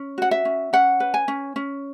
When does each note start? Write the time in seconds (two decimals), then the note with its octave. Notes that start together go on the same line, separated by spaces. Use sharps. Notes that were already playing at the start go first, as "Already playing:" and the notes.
Already playing: C#4
0.18 F#4 F#5
0.31 E5
0.45 C#4
0.73 C#4 F#5
1.00 B4
1.14 G#5
1.28 C#4
1.56 C#4